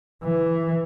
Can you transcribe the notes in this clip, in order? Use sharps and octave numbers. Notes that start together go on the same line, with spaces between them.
E3